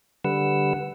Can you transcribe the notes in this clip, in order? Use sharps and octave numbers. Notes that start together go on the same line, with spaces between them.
D3 G3 B4 F#5 E6